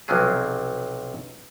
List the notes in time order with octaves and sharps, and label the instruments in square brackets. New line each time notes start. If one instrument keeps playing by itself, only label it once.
[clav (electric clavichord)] B1 C3 F3 F#3 G#4